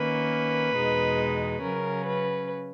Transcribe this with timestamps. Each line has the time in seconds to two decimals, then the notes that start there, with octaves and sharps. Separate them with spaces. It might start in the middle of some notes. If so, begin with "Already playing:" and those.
Already playing: D#3 A#3 C#4 B4
0.76 E2 B2 G#3 D#4
1.62 C#3 F#3 C#4 A#4
2.06 B4